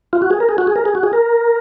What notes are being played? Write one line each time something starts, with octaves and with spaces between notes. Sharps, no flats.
F4
F#4
G#4
A#4
G#4
F#4
G#4
A#4
G#4
F#4
G#4
A#4